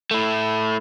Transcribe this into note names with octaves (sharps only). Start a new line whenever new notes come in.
A3 E4